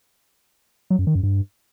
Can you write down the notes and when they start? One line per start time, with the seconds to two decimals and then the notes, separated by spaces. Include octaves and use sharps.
0.90 F#3
0.99 F#2
1.07 D#3
1.15 F#2
1.23 G2